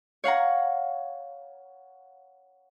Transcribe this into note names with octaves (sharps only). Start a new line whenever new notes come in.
C#5 F5 F#5 A#5